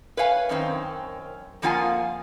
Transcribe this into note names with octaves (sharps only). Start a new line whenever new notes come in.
B4 C#5 F5 G#5
F#2 D#3 C4 C#4
F2 F3 A#3 F4 F#5 G#5